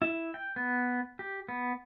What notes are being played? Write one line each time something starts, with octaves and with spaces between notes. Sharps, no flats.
E4
G5
B3
G4
B3